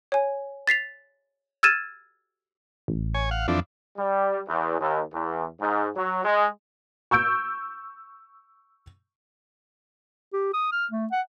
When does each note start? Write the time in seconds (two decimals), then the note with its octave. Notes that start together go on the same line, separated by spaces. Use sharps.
0.12 C#5 G#5
0.67 A6 B6 C7 F7
1.63 E6 F6 G#6 A6 D#7 E7
2.88 A1
3.14 C#5 G#5
3.31 F5 F#5
3.48 F2 E3 F3 D4
3.97 G3
4.48 E2
4.80 D#2
5.13 E2
5.60 G#2
5.96 F#3
6.25 G#3
7.11 C#6 E6 G6 D7
10.33 G4
10.54 D#6
10.72 F6
10.91 A3
11.12 F#5